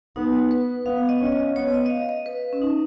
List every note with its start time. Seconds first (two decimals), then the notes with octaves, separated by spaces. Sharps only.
0.16 B3 D#4
0.51 B4
0.86 B3 F5
1.09 D#5
1.21 C#4
1.32 D#5
1.56 B3 C#5
1.74 D#5
1.86 D#5
1.90 F5
2.09 D#5
2.26 B4
2.53 C#4
2.62 D#4